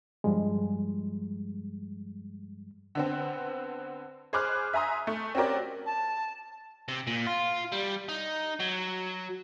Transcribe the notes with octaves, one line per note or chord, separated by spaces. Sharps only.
G2 F3 G3 G#3
D3 B3 C4
G#4 C5 B5 D6 F6 F#6
E5 G#5 A#5 C6 D#6
A3
C4 C#4 F#4 G4 A#4 D5
A5
C3
A#2
F4
G3
D#4
F#3